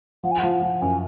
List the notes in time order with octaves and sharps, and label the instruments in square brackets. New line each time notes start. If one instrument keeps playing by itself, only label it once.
[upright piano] F3 [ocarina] F#5
[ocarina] G#5
[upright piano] F3 [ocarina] F#5
[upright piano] F3
[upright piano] F#2 [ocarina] G#5